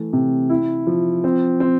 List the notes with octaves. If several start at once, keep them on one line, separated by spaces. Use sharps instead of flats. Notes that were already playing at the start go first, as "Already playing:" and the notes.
Already playing: E3 A3
C3
E4
F3
C4
C4